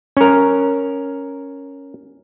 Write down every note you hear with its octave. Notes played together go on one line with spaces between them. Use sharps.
C#4 A#4